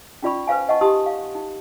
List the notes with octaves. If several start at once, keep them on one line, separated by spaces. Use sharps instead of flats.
C#4 D#4 F4 D5 B5 C#6
B4 C5 F5 G#5
D#5 F#5 A5 C#6
D#4 G4 A5 C6 D#6
F5
D#4